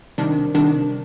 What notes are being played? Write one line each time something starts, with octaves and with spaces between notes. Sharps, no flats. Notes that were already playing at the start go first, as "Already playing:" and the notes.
C3 D#3 G3 D4
C3 D#3 G3 D4